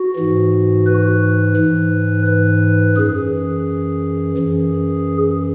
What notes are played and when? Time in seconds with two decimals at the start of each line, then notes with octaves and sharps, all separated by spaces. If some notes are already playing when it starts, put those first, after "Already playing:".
Already playing: F#4
0.16 G#2 E3
0.86 B4
1.57 G#2 E3
2.26 B4
2.96 F#2 E3 G#4
4.37 F#2 E3